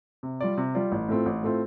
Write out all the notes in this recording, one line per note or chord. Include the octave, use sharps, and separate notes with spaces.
C3
G3 F4 D5
C3
G3 F4 D5
A1
A2 A3 C4 F4
A1
A2 A3 C4 F4